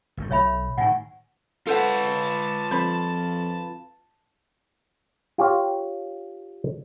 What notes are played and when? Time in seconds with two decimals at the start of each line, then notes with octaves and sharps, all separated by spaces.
0.17 G1 C#3 A3
0.31 B1 C#5 E5 B5
0.78 A2 D#3 F#5 G#5
1.67 F4 A4 B4 C5 F#5 A5
2.71 F2 C5 B5
5.38 F4 G4 C#5 F5